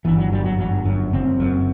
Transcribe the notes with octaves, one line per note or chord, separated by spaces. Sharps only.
G1 E3
F#3
F#2 G3
F#3
G1 F#3
F#2
F#1 C4
F#2